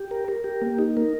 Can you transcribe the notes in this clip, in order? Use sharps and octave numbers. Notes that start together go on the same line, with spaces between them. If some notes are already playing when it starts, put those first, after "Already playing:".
Already playing: G4
A#4
A#4
G4
A#3
D#4
A#4